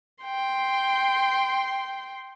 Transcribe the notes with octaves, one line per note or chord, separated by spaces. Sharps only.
G5 C6